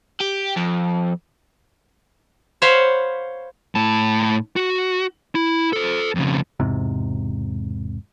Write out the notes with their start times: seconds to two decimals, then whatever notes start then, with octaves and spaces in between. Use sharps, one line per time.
0.20 G4
0.56 F2
2.62 C5 C#5 F5 F#5 B5
3.75 A2 A5
4.56 F#4
5.35 E4
5.73 A4 C5
6.15 F2 C#3
6.60 E1 G#2 C3